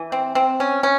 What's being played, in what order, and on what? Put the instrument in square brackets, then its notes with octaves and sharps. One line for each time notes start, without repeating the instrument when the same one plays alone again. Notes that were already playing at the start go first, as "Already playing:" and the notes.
Already playing: [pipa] E3
C4
C4
C#4
C#4